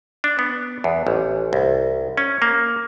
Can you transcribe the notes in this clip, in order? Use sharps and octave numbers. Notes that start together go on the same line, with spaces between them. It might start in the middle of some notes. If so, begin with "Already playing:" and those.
D4
B3
E2
A1
C2
C#4
A#3